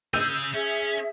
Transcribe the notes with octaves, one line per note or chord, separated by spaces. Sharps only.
C#3 G#4 E6 G6 D#7
C#4 G#4 E5